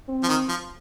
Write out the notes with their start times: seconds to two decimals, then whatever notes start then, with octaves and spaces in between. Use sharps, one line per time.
0.08 C4
0.23 F3
0.29 D#3
0.48 F3